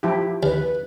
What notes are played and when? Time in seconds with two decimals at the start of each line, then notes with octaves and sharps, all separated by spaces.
0.03 F3 E4 G4
0.43 D#2 B4